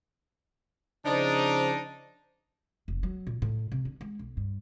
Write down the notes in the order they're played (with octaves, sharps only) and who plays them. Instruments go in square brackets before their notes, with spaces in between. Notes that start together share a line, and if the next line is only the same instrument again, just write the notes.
[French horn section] C#3 F3 C5 [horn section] D4 D#4
[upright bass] F1
F#3
A#2
A2
C3
D4
G#3
B1
G2